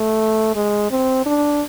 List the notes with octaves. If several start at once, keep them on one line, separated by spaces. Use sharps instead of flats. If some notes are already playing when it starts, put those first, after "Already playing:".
Already playing: A3
G#3
C4
D4